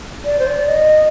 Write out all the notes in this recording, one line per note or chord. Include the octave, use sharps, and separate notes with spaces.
D5
C5
D5
D#5